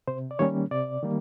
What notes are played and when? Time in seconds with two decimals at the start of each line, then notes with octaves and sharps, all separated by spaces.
0.08 C3 C5
0.31 D5
0.39 D#3 G3 A#3 C#4 C#5
0.71 C3 D5
1.03 D#3 G3 A#3